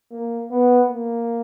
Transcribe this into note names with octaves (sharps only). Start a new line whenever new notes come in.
A#3
B3
A#3